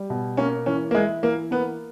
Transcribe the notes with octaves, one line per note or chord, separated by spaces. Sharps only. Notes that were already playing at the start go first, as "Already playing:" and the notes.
Already playing: G3
B2
A#3 C#4
E3 C#4
A#3
G#3 E4
E3 A#3
A#3 B3